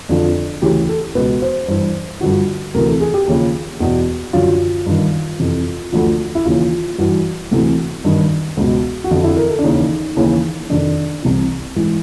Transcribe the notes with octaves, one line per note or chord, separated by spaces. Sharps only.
F2 D3 F3 D4
D2 C#3 E3 G4
A4
C#2 B2 B4
C5
G2 E3 C5
G2 D3 F3 F#4
D2 C3 E3 A#4
A4
G#4
G4
D#2 C#3 F3
E2 B2
F#2 D3 F3 F4
G2 D#3
F2 C3 E3
D2 D3 F3
E4
D#2 C#3 E3 F4
G2 E3 F#4
D2 C3 E3
G2 D#3
C#2 B2
F#4
F2 D3 F3 F4
E4
A#4
A4
D4
D#2 C#3 E3 D#4
D#2 C#3 E3
F2 C3 D#3 D4
C2 C3 E3
G#2 E3